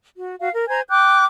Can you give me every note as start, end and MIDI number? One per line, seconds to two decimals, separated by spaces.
0.17 0.35 66
0.41 0.49 66
0.41 0.49 77
0.54 0.68 70
0.68 0.81 72
0.68 0.81 80
0.68 0.81 82
0.68 0.81 92
0.89 1.25 79
0.89 1.25 86
0.89 1.25 90
0.89 1.25 91